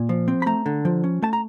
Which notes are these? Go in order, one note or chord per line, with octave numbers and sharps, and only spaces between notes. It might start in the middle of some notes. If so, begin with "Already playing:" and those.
Already playing: A#2
F3
C4
B5
A3 A#5
D3
F3
C#4
A3 A5
A#5